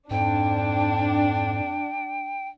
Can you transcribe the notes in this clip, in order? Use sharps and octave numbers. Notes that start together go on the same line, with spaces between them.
F2 G#2 D4 G5